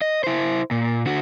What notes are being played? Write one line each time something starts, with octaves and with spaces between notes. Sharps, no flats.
D#5
E4 C5
A#2
D3 F#4